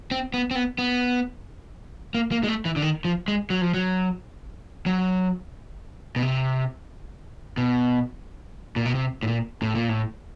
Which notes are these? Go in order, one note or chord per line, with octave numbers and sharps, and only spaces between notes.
C4
B3
C4
B3
B3
A#3
A#3
G#3
A3
E3
D3
D#3
F3
G#3
F#3
F3
F#3
F#3
B2
C3
B2
A#2
B2
C3
A2
A#2
A2
A#2
A2